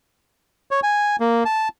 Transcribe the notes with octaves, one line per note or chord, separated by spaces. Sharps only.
C#5
G#5
A#3
A5